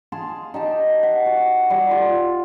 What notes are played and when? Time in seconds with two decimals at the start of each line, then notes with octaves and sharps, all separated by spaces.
0.12 G#4 F5 A5 C6
0.54 D#4 G4 A5
1.03 F#5
1.26 F#4
1.70 G3
1.91 F4